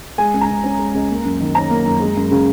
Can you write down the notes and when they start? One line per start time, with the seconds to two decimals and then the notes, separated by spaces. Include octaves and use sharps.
0.18 G#3 G#5
0.34 C#2
0.41 A#5
0.48 C#3
0.64 C#4
0.79 G#3
0.95 C#2
1.10 A#3
1.25 F#2
1.40 D#3
1.55 C#4 A#5
1.70 A#3
1.85 F#2
2.00 G#3
2.17 F#2
2.31 C#3